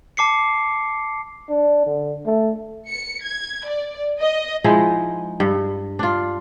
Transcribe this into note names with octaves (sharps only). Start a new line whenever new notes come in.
A5 D6 C7 C#7
D4
D3
A3
C#7
G#6
D5
D#5
F3 G#3 D#4 E4
G2
D4 F4